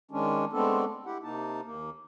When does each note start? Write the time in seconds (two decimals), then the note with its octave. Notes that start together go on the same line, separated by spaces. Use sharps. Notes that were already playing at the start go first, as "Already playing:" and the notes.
0.11 D#3 G#3 C#4 D4
0.53 G#3 A3 B3 C4 D4 A4
1.06 E4 G4 F#5
1.24 C3 A#3 D#4 A5
1.65 D#2 A#3